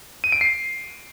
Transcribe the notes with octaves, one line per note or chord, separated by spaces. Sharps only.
D#7
D7
C7